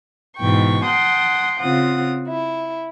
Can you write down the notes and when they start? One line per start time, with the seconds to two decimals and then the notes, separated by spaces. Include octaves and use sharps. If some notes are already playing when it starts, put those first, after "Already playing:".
0.37 G#2 B2 E3 G5 C#6
0.84 F#5 G5 A5 C6 D#6
1.59 C#3 C4 F4 F#5 D#6
2.28 E4